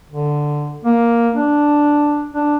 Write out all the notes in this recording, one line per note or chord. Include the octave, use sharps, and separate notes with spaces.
D3
A#3
D4
D4